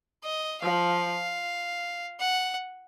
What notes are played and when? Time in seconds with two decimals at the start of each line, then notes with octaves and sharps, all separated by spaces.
0.23 D#5
0.62 F3 F5
2.20 F#5